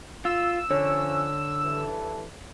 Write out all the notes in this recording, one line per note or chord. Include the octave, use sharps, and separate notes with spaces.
F4 E6
D3 F3 C#4 C#5
G2 E3 A4